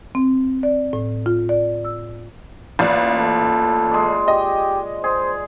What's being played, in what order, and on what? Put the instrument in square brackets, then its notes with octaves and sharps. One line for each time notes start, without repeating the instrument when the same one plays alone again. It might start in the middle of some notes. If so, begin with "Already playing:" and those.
[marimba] C4
D5
A2
F4
D5
E6
[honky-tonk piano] A1 [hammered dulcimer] A#2
[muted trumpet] A4
[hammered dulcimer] G#3 D5
[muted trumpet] G4 [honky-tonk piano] D#5
[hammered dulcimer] G#4 [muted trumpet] C5